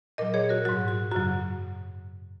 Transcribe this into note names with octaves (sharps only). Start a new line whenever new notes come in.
A#2 F#3 A#4 D#5
G#4 C#5
F#4 A#4
G#2 F#3 F#4
F#4
F#2 C#3 F#3 F#4